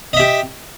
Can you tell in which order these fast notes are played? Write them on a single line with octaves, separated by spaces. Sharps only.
D#5 E5 G4